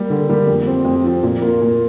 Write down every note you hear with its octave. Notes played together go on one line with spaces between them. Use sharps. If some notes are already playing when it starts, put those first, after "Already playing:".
Already playing: G3 A#3 G4
D3
G3 A#3 G4
F2
F3 C4
F2
F3 C4
A#2
A#3 F4
A#2